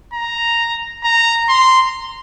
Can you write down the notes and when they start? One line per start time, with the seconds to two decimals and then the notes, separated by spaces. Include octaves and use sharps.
0.13 A#5
1.04 A#5
1.49 C6